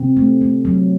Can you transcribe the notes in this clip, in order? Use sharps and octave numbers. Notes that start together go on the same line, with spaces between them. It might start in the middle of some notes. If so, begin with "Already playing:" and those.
Already playing: C3 C4
A3
A3
F#3